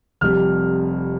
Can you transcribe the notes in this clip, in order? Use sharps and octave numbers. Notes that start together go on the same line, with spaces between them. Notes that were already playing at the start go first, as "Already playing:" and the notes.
F1 F2 C3 G3 F6